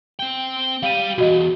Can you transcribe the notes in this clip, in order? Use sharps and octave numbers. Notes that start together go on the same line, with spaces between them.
C4 G5
G3 G4 F5 D#7
B1 E2 F#4 D#5